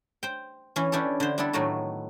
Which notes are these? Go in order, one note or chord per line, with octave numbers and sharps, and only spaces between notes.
C5 G5
E3 C#4
C#4 D4 E4 G4 A4
D3 C5
G3 B3 D4 E4 A4
A2 D#3 F#3 A3 F#4